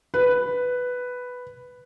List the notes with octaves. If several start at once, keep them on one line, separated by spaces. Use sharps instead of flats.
B4